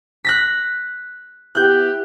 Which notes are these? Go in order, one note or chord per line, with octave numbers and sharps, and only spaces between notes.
F#6 A#6 B6
B3 E4 G4 F#6 G6